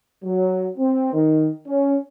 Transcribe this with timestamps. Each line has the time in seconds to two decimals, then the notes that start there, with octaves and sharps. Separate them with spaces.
0.24 F#3
0.78 C4
1.13 D#3
1.67 C#4